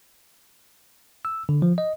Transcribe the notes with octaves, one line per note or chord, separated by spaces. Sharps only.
E6
D3
F3
D#5